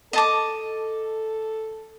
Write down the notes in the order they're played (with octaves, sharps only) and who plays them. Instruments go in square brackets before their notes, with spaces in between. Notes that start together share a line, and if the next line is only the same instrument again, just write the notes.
[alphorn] A4 [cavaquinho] D#5 A5 D6